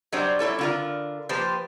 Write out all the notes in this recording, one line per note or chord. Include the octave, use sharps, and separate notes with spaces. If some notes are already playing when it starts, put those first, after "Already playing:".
F#3 G3 D4 C5
G3 E4 A4 C#5
D3 F4 A#4
F3 A#3 G4 B4 C5